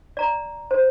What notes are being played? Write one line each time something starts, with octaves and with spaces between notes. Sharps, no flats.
D5 A#5
C5